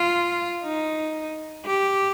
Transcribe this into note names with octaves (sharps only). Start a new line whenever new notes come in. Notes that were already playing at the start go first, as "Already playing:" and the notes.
Already playing: F4
D#4
G4